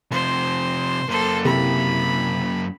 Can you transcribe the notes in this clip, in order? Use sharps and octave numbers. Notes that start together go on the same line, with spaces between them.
C3 F3 C5
F#2 A#3 A4 C5
C3 E4 B5